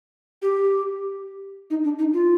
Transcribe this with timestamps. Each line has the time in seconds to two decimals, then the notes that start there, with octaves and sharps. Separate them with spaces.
0.42 G4
1.70 D#4
1.84 D4
1.99 D#4
2.13 F4